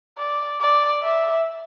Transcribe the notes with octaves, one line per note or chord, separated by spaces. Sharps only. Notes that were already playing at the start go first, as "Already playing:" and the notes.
D5
D5
E5